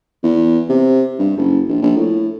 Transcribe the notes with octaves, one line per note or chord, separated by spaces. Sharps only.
E2
C3
G2
F#1
A#1
A#1
A2